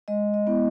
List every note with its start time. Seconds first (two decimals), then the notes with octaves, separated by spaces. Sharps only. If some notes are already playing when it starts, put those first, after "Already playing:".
0.08 G#3 D#5
0.34 D#5
0.47 B3 E4